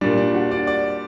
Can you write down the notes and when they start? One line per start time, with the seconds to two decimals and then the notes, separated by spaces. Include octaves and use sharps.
0.01 A#2 G3 D4
0.17 D4
0.34 F#4
0.51 D5
0.67 D5